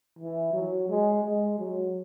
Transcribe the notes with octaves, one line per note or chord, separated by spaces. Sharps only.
E3
F#3
G#3
G#3
F#3